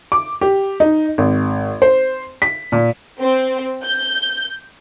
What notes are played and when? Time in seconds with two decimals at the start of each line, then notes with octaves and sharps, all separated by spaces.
0.12 D6
0.41 G4
0.80 D#4
1.18 G#1
1.82 C5
2.42 B6
2.72 A#2
3.20 C4
3.84 G6